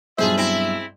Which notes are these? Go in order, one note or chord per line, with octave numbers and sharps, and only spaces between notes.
B1 G2 F4 G#4 C5 E5
C4 E4